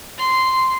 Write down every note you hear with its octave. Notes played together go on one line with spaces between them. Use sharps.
C6